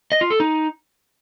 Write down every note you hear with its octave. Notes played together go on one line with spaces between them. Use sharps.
D#5
F4
A4
D#4